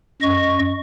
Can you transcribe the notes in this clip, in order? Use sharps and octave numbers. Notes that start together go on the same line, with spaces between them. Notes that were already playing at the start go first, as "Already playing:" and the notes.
F#2 D#5 C#6